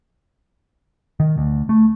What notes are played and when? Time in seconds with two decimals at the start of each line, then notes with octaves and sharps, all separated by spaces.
1.20 D#3
1.38 D2
1.69 A3